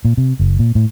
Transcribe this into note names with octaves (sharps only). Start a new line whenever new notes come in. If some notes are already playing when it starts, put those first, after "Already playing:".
A#2
C3
F#1
A#2
A2